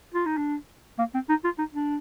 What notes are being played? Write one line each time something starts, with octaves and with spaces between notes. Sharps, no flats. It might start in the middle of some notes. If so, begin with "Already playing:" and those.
F4
D#4
D4
A#3
C4
D#4
F4
D#4
D4